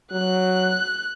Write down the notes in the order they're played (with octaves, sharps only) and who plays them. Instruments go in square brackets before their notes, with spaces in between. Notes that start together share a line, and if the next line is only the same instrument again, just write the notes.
[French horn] F#3 [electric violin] F#6